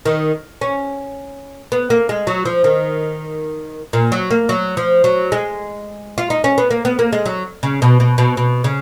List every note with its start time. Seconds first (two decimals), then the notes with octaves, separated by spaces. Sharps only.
0.06 D#3
0.61 C#4
1.72 B3
1.90 A#3
2.09 G#3
2.27 F#3
2.45 F3
2.64 D#3
3.93 A#2
4.12 F#3
4.31 A#3
4.49 F#3
4.77 F3
5.04 F#3
5.32 G#3
6.18 F4
6.30 D#4
6.44 C#4
6.58 B3
6.71 A#3
6.85 B3
6.99 A#3
7.12 G#3
7.25 F#3
7.63 C#3
7.82 B2
8.00 B2
8.18 B2
8.37 B2
8.64 C#3